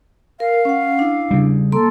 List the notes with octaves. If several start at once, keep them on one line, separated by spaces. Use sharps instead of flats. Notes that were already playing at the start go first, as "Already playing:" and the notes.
A#4 F5
C#4 F#5
D4 E4
C#3 G3
A#3 A4 C6